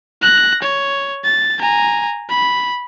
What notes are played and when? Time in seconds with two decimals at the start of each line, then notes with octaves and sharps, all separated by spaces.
0.22 F#6 A#6
0.62 C#5
1.24 A6
1.59 G#5 A#5
2.30 B5